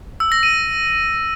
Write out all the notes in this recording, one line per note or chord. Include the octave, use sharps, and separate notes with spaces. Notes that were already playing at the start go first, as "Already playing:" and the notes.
E6
A#6
D#7